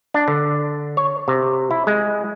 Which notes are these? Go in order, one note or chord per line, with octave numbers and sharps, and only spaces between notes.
D4
D3
C#5
C3
E4
G#3